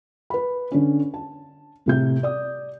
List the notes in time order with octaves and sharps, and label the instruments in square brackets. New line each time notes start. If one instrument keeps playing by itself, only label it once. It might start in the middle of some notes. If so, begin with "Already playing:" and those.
[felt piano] B4 B5
D3 C#4
A5
A2 C3 G6
D5 D#6